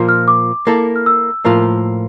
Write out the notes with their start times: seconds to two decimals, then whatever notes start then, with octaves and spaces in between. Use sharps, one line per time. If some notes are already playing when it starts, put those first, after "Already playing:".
Already playing: A#2 F3 A#3 F4
0.09 F6
0.28 D6
0.67 A#3 E4 A4
0.96 F6
1.06 E6
1.45 A2 F3 A#3 F4 A#4